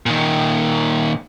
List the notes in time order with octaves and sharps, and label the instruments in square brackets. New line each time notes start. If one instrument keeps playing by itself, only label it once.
[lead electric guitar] A#2 D#3